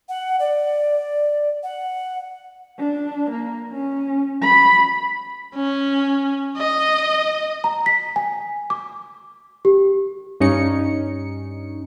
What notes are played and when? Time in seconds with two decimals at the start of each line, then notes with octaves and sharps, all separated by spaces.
0.09 F#5
0.40 D5
1.63 F#5
2.79 D4
3.31 A#3
3.72 C#4
4.42 B5
5.55 C#4
6.57 D#5
7.64 A#5
7.86 B6
8.16 G#5
8.70 D6
9.65 G4
10.40 G2 C#4 D#4 C#7